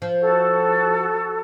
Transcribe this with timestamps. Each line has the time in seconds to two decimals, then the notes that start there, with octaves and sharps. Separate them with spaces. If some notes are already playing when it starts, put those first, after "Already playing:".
0.02 F3
0.20 F#4 A4